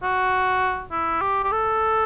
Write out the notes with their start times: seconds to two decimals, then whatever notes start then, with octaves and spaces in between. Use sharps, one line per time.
0.03 F#4
0.92 E4
1.21 G4
1.44 G4
1.52 A4